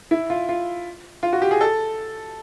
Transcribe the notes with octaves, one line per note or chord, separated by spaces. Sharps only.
E4
F4
F4
F4
F#4
G4
G#4
A4